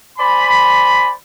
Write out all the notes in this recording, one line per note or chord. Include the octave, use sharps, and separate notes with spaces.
C5 D5 G#5 B5